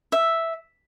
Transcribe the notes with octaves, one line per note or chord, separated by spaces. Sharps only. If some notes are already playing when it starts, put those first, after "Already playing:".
E5